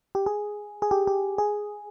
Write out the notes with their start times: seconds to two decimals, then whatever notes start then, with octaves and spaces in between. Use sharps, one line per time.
0.15 G4
0.26 G#4
0.82 G#4
0.91 G4
1.07 G4
1.38 G#4